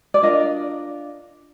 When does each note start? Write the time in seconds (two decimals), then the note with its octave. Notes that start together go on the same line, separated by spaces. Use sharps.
0.14 D5
0.22 D4 F4 A#4 D#5